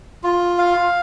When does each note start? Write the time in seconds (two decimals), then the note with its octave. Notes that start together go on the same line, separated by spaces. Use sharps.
0.23 F4
0.58 F5